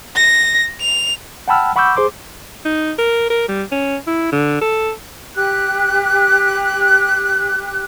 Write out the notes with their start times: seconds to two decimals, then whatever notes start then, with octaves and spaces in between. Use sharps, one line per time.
0.16 A#6
0.81 F7
1.48 F#5 G5 A5 B5 E6 F6
1.76 F#5 B5 C#6 D6 E6 G6
1.97 G#4 C5 C6 D6
2.65 D#4
2.99 A#4
3.30 A#4
3.49 G3
3.72 C#4
4.07 E4
4.32 D3
4.62 A4
5.35 G4 F#6